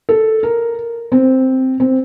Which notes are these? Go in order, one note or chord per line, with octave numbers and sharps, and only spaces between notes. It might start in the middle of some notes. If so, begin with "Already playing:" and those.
A4
A#4
C4
C4